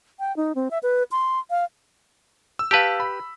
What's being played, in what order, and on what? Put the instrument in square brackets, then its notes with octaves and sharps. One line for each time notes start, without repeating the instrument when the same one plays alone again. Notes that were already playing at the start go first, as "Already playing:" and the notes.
[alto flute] G5
D#4
C4
E5
B4
C6
F5
[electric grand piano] E6
[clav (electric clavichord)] G4 B4 [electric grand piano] F5 A5 E6
[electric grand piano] B5